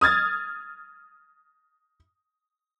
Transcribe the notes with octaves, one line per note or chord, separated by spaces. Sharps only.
D#6 F6 G#6 A6